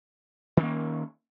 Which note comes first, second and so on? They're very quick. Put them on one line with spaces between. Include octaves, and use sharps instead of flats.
D#3 C#4 A#3